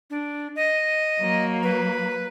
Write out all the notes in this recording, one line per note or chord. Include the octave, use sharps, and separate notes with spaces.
D4
D#5
F#3 A#3
B4